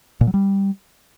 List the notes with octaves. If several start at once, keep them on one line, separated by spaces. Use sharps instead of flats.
A#2
F#3
G3